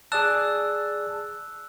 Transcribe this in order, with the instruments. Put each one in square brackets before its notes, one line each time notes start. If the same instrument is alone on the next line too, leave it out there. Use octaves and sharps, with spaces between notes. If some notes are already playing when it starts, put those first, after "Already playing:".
[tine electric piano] G#4 D5 A5 [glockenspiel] E6 F#6